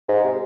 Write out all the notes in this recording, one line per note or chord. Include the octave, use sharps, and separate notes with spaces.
G#2
C3